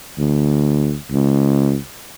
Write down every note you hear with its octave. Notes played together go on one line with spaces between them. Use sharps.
D2
C#2